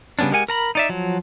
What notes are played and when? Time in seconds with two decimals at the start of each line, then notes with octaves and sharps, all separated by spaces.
0.19 C#3 G3 B3 C#4 D4
0.32 G#3 G4 A#4 F#5 G#5
0.48 A#4 A#5 B5
0.75 D#4 D5 E5
0.89 F3 F#3